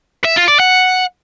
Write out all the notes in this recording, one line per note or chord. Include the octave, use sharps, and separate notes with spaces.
E5
F4
D5
F#5